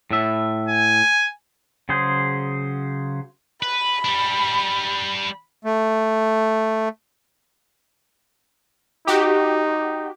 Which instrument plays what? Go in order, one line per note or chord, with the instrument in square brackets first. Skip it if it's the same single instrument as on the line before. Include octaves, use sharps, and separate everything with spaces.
[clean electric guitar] A2 E5
[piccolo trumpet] G#5
[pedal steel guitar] C#3 F#3 G#4 C5
[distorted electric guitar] B4 [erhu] B5
[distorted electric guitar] G3 D4
[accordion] A3
[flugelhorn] D#4 [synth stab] F#4 G4